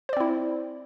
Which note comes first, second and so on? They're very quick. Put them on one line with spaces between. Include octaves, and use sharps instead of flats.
C5 D5 C4 E4